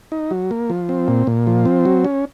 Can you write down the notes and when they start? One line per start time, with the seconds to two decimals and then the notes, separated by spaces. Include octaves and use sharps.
0.12 D#4
0.31 F#3
0.51 A#3
0.70 F3
0.89 C4
1.08 A#2
1.27 A#2
1.47 F3
1.65 C4
1.85 F#3
2.05 C#4